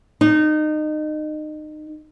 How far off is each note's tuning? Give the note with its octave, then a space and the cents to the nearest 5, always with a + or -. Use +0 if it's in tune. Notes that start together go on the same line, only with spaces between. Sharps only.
D#4 -25